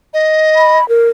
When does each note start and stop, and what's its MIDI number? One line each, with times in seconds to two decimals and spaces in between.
0.14 0.79 75
0.56 0.87 83
0.89 1.09 70